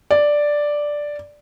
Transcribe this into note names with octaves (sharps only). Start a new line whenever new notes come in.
D5